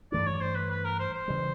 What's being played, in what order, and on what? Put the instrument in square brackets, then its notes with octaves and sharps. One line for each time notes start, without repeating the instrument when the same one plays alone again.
[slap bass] G2 E3 A3 D4 [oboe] D5
[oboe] C#5
C5
B4
B4
A#4
C5
C5
[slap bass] C#3 E3 G3